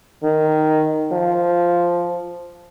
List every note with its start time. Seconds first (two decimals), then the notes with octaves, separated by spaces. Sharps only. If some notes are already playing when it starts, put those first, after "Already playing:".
0.24 D#3
1.12 F3